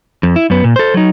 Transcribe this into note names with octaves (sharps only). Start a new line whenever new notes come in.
F2
E4
F#2 B3
A#2
A4 C5
F#3 D#4